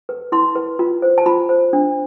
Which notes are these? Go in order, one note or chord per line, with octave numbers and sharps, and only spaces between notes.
B4
E4 C6
B4
F4
C5
A5
F4 B5
C5
D4